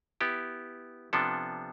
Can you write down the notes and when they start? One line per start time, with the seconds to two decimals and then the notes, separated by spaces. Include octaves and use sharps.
0.21 B3 E4 G4
1.13 C3 F3 B3 D4 A4